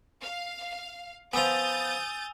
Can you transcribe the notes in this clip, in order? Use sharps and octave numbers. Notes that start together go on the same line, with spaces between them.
F5
F3 B3 G#5 D#6 E6 G6 A6 F7